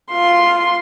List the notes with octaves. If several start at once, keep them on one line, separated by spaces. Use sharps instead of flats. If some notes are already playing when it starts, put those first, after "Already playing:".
F4 C6